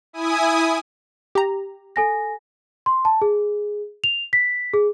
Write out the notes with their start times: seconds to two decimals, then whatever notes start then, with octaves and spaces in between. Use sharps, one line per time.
0.13 E4 G#5 D#6
1.35 G4 A#5
1.96 A4 G#5 A#6
2.86 C6
3.05 A5
3.22 G#4
4.04 F7
4.33 B6
4.74 G#4